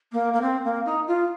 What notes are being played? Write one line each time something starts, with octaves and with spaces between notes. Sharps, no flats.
A#3
A#3
C4
A#3
D#4
F4